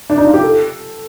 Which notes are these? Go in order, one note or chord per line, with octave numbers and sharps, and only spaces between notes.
D4
D#4
F4
G4
A4